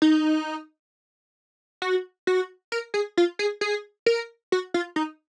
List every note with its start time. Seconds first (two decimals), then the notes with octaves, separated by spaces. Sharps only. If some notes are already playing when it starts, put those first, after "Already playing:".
0.02 D#4
1.82 F#4
2.27 F#4
2.72 A#4
2.94 G#4
3.17 F4
3.39 G#4
3.61 G#4
4.06 A#4
4.52 F#4
4.74 F4
4.96 D#4